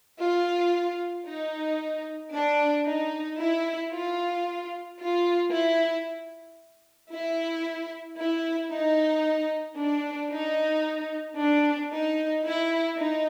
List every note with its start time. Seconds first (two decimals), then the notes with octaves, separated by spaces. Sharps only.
0.20 F4
1.27 D#4
2.33 D4
2.86 D#4
3.39 E4
3.93 F4
4.99 F4
5.53 E4
7.12 E4
8.19 E4
8.72 D#4
9.78 D4
10.31 D#4
11.38 D4
11.92 D#4
12.45 E4
12.98 D#4